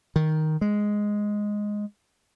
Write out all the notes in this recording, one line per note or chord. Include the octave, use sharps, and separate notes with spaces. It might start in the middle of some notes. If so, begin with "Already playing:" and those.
D#3
G#3